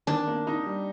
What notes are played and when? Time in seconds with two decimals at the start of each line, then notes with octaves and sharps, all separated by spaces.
0.07 D#3 D4
0.27 A#3
0.47 D#4
0.66 G3